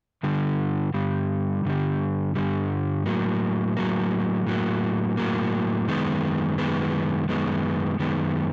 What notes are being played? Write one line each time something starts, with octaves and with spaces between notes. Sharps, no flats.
G2 D3 G3
G2 D3 G3
G2 D3 G3
G2 D3 G3
A2 F#3 A#3
A2 F#3 A#3
A2 F#3 A#3
A2 F#3 A#3
F#2 D#3 G#3 B3
F#2 D#3 G#3 B3
F#2 D#3 G#3 B3
F#2 D#3 G#3 B3